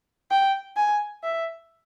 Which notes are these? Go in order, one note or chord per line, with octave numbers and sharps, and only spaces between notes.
G5
G#5
E5